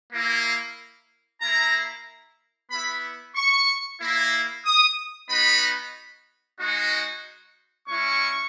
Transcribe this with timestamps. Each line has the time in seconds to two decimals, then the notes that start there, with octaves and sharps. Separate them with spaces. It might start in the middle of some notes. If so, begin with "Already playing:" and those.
0.12 A#3 E4
1.41 A#3 E4 A#5
2.70 B3 E4 B5
3.35 C#6
4.00 A#3 E4
4.65 D#6
5.29 B3 D#4 F#4 B5
6.59 G#3 D#4 F#4
7.88 G#3 C#4 E4 C#6